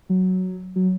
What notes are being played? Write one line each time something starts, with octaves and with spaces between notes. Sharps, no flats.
F#3
F#3